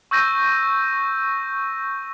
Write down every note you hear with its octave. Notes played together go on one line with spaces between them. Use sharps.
C#6 E6 G6 A#6 D#7